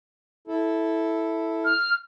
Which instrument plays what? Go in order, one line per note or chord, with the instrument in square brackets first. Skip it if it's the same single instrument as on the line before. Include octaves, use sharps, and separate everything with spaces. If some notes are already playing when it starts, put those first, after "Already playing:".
[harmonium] E4 A4
[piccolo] F6